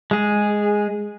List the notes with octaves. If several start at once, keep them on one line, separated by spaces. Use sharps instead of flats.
G#3 G#4